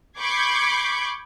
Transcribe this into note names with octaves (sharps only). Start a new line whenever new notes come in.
B5 C#6 D6 G6 G#6 C7